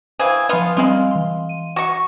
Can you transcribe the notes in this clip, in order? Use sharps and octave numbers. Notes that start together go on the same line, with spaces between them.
E3 G#4 C5 F5 G5
F3 B3 F4 C6 F7
G3 G#3 C4 F4
E3 C6
D#7
F#4 C#6